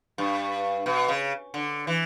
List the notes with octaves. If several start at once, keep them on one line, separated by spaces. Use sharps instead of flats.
G2
B2
C#3
D3
E3